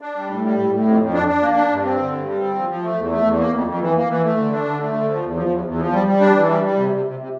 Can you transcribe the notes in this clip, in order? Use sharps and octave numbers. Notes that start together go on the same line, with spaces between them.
D4
G3
A2
G3
A2
A2
F2
F2
D4
D4
A#3
D4
G2
C4
D3
G2
G3
C4
F3
F3
A3
E2
A3
E2
A#3
F2
F2
E3
A#3
E3
A3
D3
D4
D3
A3
D3
F3
E2
F3
E2
E2
F3
G3
G3
D4
E3
G3
G3
C3
C3
C3
C3